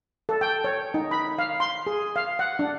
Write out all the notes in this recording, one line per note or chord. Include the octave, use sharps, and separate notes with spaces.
A4
G5
C#5
D#4
B5
F5
C6
G#4
F5
F#5
D4